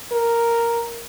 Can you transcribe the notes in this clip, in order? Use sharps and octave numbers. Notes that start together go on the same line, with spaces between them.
A#4